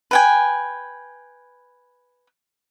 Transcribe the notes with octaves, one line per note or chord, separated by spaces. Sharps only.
B4 G5 G#5